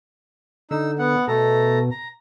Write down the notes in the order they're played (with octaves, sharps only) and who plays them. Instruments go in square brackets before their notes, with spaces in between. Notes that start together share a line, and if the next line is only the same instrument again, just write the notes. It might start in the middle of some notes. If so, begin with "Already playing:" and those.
[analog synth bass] D3 [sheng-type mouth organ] D#4 E6
[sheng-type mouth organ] B3 F#5
[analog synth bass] B2 [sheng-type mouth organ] A3 A4 A#5
[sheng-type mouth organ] A#5